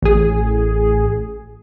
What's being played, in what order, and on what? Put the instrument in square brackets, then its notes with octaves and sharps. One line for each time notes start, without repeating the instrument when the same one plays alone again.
[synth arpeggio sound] A1 G#4